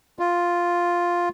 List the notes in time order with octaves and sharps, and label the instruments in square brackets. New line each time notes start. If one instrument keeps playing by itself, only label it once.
[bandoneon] F4